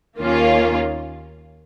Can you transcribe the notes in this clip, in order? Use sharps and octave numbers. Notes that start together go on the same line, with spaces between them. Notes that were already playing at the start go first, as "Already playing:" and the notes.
D#2 D#3 A#3 C#4 F4